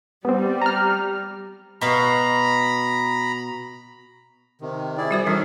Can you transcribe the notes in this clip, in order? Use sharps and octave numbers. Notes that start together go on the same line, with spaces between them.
G3 B3 C4
A#5 F6
B2 F5 A#5 B5
C3 D#3
E4 G#4 D5
G3 F#4 C5
E3 G3 C#4 D#4 A4 A#4